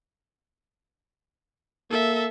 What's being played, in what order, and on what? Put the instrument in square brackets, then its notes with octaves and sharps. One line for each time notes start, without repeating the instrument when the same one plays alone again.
[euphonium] A#3 [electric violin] A4 E5